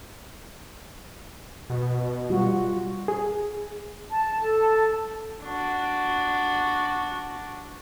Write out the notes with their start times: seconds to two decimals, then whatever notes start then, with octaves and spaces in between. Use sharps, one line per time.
1.70 B2
2.30 G3 F4 F#4
3.08 G#4
4.09 A5
4.39 A4
5.44 D4 F#4